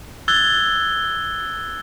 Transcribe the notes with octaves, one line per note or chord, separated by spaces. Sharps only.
E6 F#6 G#6 A6 G7